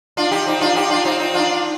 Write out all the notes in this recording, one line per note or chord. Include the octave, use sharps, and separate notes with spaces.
D4 F4
D#4 G4
C4 D#4
D4 F4
D#4 G4
D4 F4
C4 D#4
C4 D#4
D4 F4